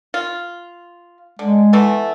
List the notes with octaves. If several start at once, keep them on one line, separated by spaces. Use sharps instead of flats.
F4
D3 G#3
E3 A3 B3